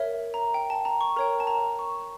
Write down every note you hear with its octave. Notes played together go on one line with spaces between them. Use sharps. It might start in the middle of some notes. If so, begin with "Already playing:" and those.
Already playing: A#4 C#5 E5
A#5
G5
A5
A#5
C#6
A#4 C#5 G5 A#5
A5
A#5
C#6